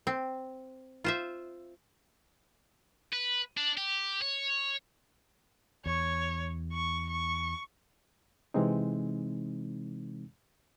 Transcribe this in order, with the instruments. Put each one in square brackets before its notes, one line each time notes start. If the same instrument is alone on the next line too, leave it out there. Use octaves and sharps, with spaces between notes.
[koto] C4
F4 C5 E5
[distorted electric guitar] B4
D4
G4
C#5
[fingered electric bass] E2 [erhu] C#5
[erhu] C#6
C#6
[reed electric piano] C3 E3 G#3 C4 D#4